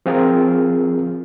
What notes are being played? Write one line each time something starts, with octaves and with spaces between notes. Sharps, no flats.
F3 C4 F4 G#4 A#4